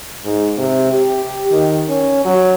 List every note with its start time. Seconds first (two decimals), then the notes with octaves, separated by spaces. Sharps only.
0.25 G#2
0.58 C3
0.92 G4
1.51 D#3
1.89 C#4
2.25 F#3